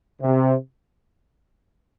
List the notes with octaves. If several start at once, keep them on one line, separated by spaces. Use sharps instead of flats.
C3